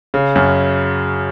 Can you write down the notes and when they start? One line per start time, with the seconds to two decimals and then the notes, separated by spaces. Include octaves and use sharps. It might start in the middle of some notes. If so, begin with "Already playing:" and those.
0.14 C#3
0.36 F#2